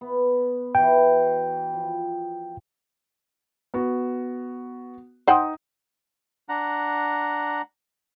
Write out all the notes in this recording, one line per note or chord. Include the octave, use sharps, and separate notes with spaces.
B3
E3 F#4 G5
F3
B3 F#4
D#4 C5 F#5 G5 D#6
D4 F#5 A#5